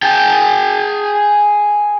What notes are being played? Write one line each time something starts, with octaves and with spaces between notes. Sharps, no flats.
G#4 G5